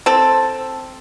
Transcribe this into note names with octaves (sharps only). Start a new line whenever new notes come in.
C4 A4